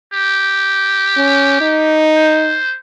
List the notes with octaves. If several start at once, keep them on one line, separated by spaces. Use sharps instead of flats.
G4
C#4
D#4
C5